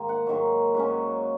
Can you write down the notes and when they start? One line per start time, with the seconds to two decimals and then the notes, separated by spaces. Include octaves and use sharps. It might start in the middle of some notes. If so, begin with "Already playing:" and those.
Already playing: G#2 D#3 A#3 C5
0.09 F#5
0.26 G#2 D#3 F#3 A#3
0.74 G#2 F#3 C#4